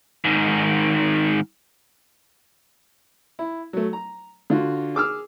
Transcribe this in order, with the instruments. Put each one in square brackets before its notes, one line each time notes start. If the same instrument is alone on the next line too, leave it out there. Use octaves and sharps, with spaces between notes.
[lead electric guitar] G#2 D#3
[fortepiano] E4
F#3 A3
A#5
D3 F4 F#4
G#4 D6 E6 F6